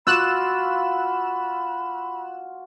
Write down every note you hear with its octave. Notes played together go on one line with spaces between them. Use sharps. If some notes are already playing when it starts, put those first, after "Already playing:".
F4 F#4 D5 B5 E6 F#6 E7